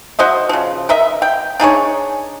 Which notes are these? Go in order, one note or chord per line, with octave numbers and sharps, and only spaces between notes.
F#4 C5 D#5 E5
C#3 F3
A#4 D#5 E5
G5
D4 D#4 G#4 C#5